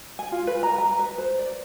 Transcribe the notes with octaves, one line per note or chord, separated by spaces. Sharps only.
G#5
F4
B4
A#5
A#5
B4
C5
D5